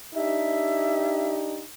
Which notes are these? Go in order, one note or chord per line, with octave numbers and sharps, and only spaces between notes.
D4 D#4 G4 E5